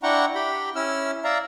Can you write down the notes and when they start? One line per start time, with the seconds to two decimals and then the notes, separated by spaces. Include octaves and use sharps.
0.03 D4 E4 F#5 G5 A#5 C#6
0.35 G4 G5 B5
0.75 C#4 E4 E6 F6
1.24 D5 E5 F5 A#5